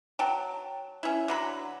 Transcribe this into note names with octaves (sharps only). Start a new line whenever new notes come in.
F#3 G5 A5
C#4 E4
D3 F#3 B5